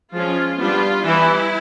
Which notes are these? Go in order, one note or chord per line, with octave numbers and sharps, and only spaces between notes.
F3 G#3 C#4 F4
G3 B3 D4 F4
E3 G3 B3 E4